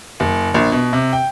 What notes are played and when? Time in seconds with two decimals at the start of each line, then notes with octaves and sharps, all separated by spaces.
0.20 F#1
0.54 A#1
0.72 B2
0.93 C3
1.13 G5